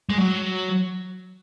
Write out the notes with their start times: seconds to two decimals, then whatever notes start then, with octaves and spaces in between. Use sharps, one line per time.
0.10 G#3
0.18 F#3